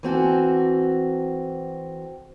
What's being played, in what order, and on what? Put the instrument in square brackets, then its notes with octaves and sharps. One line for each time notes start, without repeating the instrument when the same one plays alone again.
[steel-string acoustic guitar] E3 C4 F#4 A4